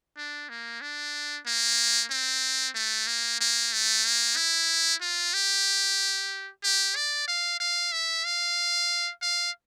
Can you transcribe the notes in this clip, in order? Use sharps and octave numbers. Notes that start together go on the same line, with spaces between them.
D4
A#3
D4
A#3
C4
A3
A#3
A#3
A3
A#3
E4
F4
G4
G4
D5
F5
F5
E5
F5
F5